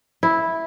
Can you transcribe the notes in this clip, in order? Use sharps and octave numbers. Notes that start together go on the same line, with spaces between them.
E4